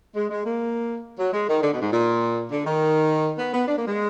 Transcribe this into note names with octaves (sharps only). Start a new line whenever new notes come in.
G#3
G#3
A#3
F#3
G#3
D#3
D3
B2
G#2
A#2
D3
D#3
B3
B3
D4
A#3
G#3